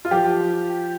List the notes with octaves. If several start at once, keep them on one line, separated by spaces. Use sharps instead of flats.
F4
F3 G4